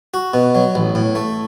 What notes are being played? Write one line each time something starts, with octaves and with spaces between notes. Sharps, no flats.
F#4
B2
F#3
A1
A2
A3